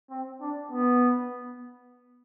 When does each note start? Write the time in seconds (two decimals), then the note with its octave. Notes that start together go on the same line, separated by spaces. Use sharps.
0.11 C4
0.41 D4
0.72 B3